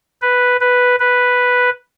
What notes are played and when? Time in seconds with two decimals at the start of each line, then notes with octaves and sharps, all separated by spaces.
0.22 B4
0.61 B4
1.00 B4